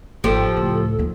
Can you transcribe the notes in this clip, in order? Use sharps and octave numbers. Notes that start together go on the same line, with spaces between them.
G#1 F3 G4 A4
C#2 A2
D#2 F3